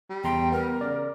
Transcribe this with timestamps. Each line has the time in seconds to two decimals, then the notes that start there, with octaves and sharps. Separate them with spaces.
0.10 G3
0.24 E2 G5 A#5 C6
0.52 B3 A#4
0.81 C#3 D5